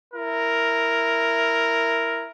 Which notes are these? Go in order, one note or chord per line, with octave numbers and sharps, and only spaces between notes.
E4 A#4